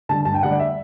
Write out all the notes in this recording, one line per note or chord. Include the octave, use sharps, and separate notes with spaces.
D3 G3 A5
G2 A5
G5
D3 G3 F#5
D5
E5